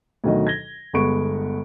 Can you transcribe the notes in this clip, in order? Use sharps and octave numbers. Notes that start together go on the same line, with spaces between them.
D2 B2 D#3 F#3 D#5
G#6 A#6 G7
G1 G#3 B3 C#6 D7